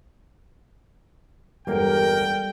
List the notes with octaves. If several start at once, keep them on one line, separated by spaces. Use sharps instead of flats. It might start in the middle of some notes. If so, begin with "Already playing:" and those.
G1 E2 G3 G#3 A#3 A4 A#4 G5